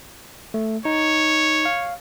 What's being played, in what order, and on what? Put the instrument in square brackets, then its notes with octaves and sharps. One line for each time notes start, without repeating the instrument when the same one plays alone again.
[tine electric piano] A3
[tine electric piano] D#4 [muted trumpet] C#5
[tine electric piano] F5